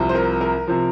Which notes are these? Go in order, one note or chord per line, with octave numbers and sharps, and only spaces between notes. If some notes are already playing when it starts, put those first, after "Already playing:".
Already playing: C2 C3 F3
C5
A#4
A#4
C3 F3